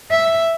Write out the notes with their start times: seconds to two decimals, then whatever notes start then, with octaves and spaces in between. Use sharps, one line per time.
0.11 E5